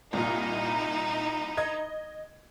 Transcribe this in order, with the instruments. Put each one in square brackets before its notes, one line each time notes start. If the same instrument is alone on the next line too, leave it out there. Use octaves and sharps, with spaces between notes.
[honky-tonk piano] C2 A#2 [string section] D#4 E4
[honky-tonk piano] D#5 G#6